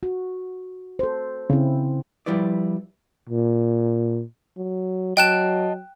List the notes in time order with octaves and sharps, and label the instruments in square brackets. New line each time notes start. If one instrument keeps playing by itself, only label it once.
[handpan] F#4
A4 C5
[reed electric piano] C#3 [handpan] C4 E4
[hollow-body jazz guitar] F3 G3 E4 B4 D5
[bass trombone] A#2
[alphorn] F#3
[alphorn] F#3 [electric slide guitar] D#5 A5 [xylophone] G5 F#6 E7